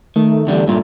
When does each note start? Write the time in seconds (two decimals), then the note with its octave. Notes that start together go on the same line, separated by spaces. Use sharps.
0.16 D#3 A3
0.47 E2 D3 G3
0.67 G2 A#2